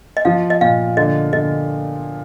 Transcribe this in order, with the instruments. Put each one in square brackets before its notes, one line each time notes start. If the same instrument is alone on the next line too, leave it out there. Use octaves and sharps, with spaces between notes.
[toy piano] D#5
[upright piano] F3 [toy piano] F5
[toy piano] D#5
[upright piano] A#2 [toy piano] F5
[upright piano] D3 [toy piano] D#5
[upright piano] D3 [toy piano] D#5